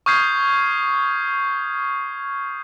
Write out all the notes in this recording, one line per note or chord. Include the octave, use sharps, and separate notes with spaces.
C#6 D#6 F6 G6 G#6 C7